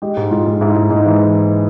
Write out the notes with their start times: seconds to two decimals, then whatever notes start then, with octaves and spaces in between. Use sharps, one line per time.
0.02 G#3 G4
0.17 G#2
0.31 G#2 F4
0.47 G#2
0.61 G#2 E4
0.76 G#2
0.90 G#2 D#4
1.05 E3